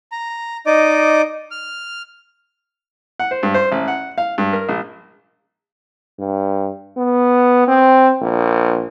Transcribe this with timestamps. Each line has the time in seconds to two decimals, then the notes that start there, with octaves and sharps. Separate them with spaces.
0.12 A#5
0.66 D#4 D5 D#5 D6
1.51 F6
3.19 F#5
3.31 C5
3.43 G2
3.54 C5
3.72 A1
3.88 F#5
4.18 F5
4.38 G2
4.53 A#4
4.69 A#1
6.19 G2
6.97 B3
7.68 C4
8.21 A#1